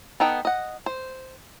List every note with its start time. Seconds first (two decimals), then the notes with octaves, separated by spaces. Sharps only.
0.20 B3 D#4 A4 F#5 G5
0.45 D#5 F#5
0.86 C5